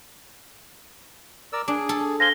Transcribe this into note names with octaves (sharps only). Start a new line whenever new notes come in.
A#4 D5 E6
D4 G#4
A4
C5 F5 G#5 A#6 G7